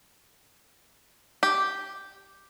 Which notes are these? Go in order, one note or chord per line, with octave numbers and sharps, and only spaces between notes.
G4